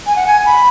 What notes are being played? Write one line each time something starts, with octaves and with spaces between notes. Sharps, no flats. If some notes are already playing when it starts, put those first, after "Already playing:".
G#5
F#5
G#5
B5